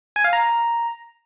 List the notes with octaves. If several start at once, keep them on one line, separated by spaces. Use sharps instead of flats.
G#5
F5
A#5